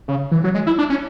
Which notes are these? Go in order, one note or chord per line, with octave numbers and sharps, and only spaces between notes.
C#3
E3
F#3
G#3
E4
D4
C#4